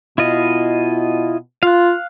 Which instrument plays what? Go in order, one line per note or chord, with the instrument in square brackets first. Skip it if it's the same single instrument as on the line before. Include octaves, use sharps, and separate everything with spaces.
[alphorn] B2 [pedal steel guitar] E4 F4 D#5
[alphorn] F4 [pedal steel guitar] F5 F#6